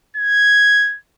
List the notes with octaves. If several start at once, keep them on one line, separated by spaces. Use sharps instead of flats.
G#6